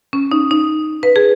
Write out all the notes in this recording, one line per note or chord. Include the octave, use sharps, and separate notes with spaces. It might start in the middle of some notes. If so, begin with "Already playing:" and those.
C#4
D#4
D#4
B4
G#4